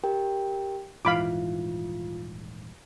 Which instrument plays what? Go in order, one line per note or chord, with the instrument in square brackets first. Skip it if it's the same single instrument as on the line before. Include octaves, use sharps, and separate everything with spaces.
[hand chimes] G4 A#4 G5
[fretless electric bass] D#1 G#2 E3 [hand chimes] F4 [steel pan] F5 B5 D6